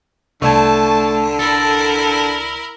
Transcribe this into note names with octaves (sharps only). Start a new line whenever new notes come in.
C2 D3 A3 D5 A5 G#6
E4 A4 A#4